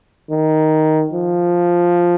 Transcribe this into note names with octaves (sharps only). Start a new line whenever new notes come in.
D#3
F3